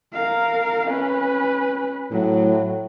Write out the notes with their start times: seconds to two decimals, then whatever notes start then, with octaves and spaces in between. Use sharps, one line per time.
0.13 A#4 F5
0.87 C#4 B4
2.12 A2 F#3